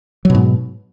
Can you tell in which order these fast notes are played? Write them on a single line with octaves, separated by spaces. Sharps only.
F#3 B2 G#2